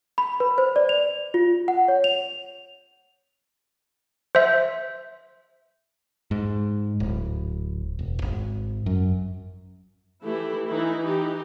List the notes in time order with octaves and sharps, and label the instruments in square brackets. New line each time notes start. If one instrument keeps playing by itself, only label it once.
[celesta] B5
B4
C5
D5
F7
F4
F#5
C#5
F7
[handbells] C5 E5
[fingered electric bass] G#2
D1
E1
G#1
F#2
[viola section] E3 A3 E4 G4
E3 D#4 E4
E3 D#4 G4